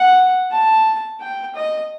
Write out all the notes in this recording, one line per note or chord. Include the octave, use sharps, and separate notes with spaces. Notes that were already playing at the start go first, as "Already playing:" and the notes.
Already playing: F#5
A5
G5
D#5